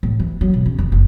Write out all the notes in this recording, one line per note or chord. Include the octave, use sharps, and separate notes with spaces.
A2
E3
F#3
B2
C#3
F1
F#1